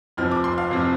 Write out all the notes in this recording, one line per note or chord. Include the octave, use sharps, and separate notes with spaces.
F1 F2 C3 F3 F6
D6
C6
F5
F1 F2 C3 F3